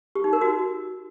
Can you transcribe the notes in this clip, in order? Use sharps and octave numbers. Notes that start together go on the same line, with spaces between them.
G4
D#4
A#4
F#4